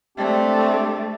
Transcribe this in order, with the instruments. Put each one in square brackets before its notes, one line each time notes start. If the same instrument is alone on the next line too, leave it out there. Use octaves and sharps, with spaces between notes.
[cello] A3 [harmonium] C4 D4 G4